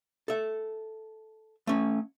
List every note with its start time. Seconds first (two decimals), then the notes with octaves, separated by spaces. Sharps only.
0.28 A4 E5
1.67 A3 C#4